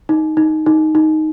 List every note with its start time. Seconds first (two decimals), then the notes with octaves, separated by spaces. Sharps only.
0.09 D#4
0.37 D#4
0.66 D#4
0.95 D#4